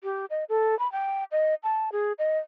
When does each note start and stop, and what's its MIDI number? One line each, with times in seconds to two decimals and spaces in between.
0.04 0.26 67
0.30 0.44 75
0.49 0.77 69
0.79 0.90 83
0.92 1.24 79
1.32 1.55 75
1.63 1.92 81
1.92 2.13 68
2.19 2.39 75